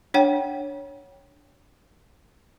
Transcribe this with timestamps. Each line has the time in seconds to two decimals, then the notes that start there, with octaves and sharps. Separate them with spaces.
0.14 D4 C#5 F#5 G5